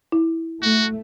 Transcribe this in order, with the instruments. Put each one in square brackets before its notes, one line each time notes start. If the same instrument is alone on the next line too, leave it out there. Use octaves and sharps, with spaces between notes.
[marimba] E4
[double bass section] A3 [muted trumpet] F#4